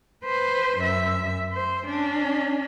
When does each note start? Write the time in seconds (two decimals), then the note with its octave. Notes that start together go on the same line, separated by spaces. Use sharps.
0.25 B4 C5
0.79 F#2 E5
1.52 C5
1.87 C#4 D4